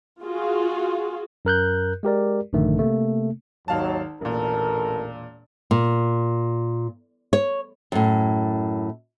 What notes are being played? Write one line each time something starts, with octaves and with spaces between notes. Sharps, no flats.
F4 F#4 G#4
F#2 A#4 F#6 G6
G#3 G4 A#4 D5
A#1 G2 D3 D#3 A3
C3 A3 A#3
G#1 D#2 F#3 F5 A5
E1 A1 A#2 A4 A#4
A#2
C#5
F#2 A2